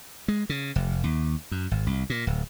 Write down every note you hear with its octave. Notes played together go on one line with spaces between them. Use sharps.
G#3
C#3
F1
D#2
F#2
G#1
C2
A#2
D1